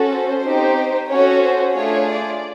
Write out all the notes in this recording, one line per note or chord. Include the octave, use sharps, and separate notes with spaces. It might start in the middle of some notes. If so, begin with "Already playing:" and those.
Already playing: C#4 F#4 A4
C5
C4 D#4 G4
C#4 F#4 A4 C#5
C5
A3 D4 F4 G#4 C#5
D5